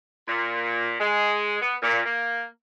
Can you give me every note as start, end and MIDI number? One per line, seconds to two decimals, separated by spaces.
0.28 0.95 46
1.00 1.57 56
1.61 1.75 59
1.82 1.99 46
2.06 2.45 58